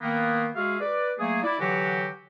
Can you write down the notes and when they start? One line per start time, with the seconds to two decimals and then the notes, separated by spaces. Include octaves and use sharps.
0.01 D#3 A#3 B3
0.55 G#3 F#4 G#4 E5 F5
0.80 B4 D5
1.19 F#3 A3 A#3 G#4
1.42 E4 D5
1.59 D3 E3 F#3 F#4 G4